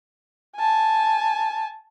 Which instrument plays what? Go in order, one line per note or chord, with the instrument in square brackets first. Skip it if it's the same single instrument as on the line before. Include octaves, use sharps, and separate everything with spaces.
[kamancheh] G#5 A5